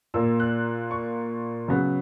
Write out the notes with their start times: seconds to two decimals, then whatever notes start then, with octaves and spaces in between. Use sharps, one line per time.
0.14 A#2 A#3 E6
0.40 F#6
0.91 C#6
1.68 C#3 F#3 B3